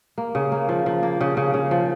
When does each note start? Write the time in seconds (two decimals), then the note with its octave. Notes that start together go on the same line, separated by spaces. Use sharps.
0.18 A#3
0.35 C#3
0.52 A#3
0.69 F3
0.86 F3
1.03 A#3
1.21 C#3
1.37 C#3
1.54 C#3
1.71 F3